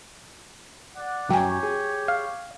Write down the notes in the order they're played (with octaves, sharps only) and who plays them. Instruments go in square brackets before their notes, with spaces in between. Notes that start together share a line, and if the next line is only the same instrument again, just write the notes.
[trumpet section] D5 F#5
[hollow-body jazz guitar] F#2 F#3 [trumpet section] G4 C#5 [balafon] G5 G#5
[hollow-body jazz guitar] G#4
[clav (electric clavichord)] F5